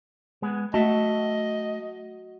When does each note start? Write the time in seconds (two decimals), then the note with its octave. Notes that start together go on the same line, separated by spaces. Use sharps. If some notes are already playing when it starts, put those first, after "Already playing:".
0.42 G#3 B3 G#4
0.74 A3 F#4 D#5 E5 A5